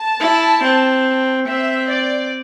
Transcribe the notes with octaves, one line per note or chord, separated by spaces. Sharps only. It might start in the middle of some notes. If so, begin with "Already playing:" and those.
Already playing: A5
E4
C4
C4 E5
D5